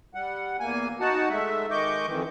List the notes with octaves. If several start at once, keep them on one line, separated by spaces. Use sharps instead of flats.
G3 F#5
E2 A#3 G#5
D#4 F#4 F#5 A5
G#3 A3 E5
D#3 G#3 D#5 C#6 D6 G6
F2 D#3 E3